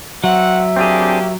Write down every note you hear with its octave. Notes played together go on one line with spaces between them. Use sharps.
F#3 C4 E5 F#5
A#3 C4 D4 G4 G#4